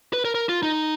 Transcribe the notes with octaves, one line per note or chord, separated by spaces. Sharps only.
B4
A#4
A#4
F4
D#4